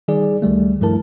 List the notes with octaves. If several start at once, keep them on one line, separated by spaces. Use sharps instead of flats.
D#3 G3 D#4 G#4 D5
C#2 D#3 G3 A3
G2 F3 A3 E4 A#4 A5